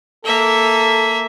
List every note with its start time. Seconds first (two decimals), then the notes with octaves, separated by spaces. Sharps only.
0.25 A#3 A4 E5